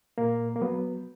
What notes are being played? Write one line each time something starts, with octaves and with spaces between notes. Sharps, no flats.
A#2 A#3
A#3
F#3 B3